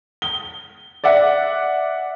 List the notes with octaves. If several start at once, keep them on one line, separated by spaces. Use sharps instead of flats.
G7
D5 E5 F#5